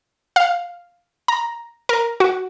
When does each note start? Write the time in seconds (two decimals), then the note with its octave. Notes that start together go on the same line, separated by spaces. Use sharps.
0.36 F5
1.28 A#5
1.89 A#4
2.20 F#4